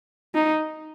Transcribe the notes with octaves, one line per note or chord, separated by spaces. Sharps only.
D#4